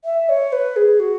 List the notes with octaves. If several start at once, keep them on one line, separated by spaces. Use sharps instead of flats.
E5
C#5
B4
G#4
F#4